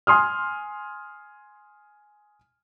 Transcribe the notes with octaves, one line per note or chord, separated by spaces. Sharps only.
G#5 C6 D#6 F6